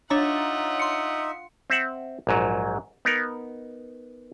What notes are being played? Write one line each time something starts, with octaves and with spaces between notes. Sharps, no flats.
D4 D#4 F4 C#5 E5 F#5 A#5
C6 C#7
C4 E5 F#5
A#1 G#2 F#3
B3 D#4 A#4